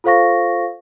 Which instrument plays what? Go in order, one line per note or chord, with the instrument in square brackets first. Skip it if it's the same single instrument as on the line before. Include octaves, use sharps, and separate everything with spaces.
[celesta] F4 A4 C5 F5 C#6 A#6